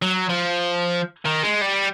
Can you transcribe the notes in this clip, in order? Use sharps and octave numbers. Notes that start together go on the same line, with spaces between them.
F#3
F3
D#3
G#3
G3